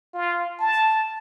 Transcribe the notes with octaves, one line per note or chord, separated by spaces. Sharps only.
F4
A5